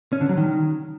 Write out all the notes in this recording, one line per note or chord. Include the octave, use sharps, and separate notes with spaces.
C#4
D3
F#3
D#3